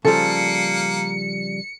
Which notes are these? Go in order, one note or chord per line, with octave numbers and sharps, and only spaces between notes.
C#3 F3 G3 A#3 A4 C#7